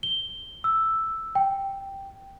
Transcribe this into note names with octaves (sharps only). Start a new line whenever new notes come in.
G7
E6
G5